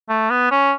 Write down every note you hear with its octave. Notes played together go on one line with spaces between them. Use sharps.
A3
B3
C#4